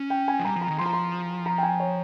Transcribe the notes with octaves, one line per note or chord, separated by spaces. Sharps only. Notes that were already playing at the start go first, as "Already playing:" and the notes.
Already playing: C#4
G5
G#5
F3
G3 A#5
F3
A#5
D#3
F3 C6
A#5
C6
A#5
G5
G#5
C#5